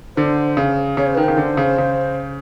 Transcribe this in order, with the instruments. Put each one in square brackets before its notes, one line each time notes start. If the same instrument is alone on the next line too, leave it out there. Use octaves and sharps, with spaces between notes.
[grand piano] D3 [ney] C5
[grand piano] C#3
[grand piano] C#3 [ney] C#5
[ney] C5
[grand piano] D#3 [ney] B4
[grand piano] C#3 [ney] C5
[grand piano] D3
C#3
C#3